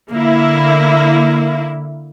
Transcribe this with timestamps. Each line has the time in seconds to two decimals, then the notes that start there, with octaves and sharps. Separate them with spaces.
0.13 D3 A#3 E4